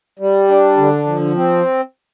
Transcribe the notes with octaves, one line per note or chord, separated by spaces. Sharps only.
G3
D4
D3
F3
C4